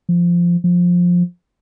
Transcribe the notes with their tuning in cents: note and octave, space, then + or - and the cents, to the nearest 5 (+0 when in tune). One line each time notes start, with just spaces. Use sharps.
F3 -10
F3 +15